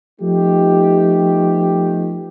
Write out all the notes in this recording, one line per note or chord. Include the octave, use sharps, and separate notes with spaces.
F3 A3 B3 D#4 G4